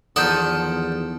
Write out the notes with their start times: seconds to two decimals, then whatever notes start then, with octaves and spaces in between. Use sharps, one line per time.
0.16 E2 D#3 F3 A4 D5 F#5 D#6 G6